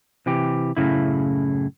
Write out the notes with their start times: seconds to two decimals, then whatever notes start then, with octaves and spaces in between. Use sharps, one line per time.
0.26 C3 E3 G4
0.77 F#2 A2 C#3 E4